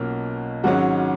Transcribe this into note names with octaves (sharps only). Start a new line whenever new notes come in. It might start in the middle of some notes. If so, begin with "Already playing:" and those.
Already playing: B1 B2 A#3 C#4 F4
G#1 G#2 F#3 C#4 F#4